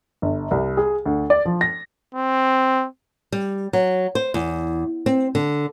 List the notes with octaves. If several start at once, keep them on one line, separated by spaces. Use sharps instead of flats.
G1
C2
G#4
D2
D5
F3
A#6
C4
G3
F#3
C5
E2
C4
D3